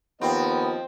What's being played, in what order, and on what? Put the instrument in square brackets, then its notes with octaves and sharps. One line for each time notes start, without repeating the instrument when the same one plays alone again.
[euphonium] D#2 [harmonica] F3 D#5 [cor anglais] B3 [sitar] C4